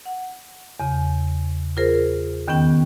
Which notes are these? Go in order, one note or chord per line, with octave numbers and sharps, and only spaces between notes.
F#5
E2 C#3
F4 G#4 A#4 C5
D#2 D#3 B3 C#4 G5